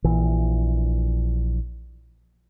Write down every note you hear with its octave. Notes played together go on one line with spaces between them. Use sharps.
A#1 E3